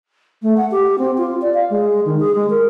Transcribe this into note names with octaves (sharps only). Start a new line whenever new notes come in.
A3
F#5
G4
C4
F4
D5
F5
G#3
D#3
G#4
G#3
A#4